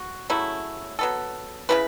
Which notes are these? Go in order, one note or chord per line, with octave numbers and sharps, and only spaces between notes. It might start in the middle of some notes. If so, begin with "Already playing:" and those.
Already playing: F#4
C#3 F#3 A3 E4
F#3 B3 A4
C#3 A3 E4 B4